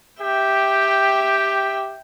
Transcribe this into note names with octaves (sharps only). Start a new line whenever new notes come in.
G4 E5 G5